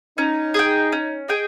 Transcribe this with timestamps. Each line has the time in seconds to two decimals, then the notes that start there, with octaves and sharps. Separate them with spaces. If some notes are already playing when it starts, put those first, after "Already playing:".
0.17 C#4 D#4
0.54 G#4 D#5 G5
0.92 C#4
1.28 G#4 D#5 G5